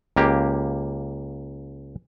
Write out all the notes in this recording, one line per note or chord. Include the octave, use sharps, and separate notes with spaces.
C#2 A#3 G4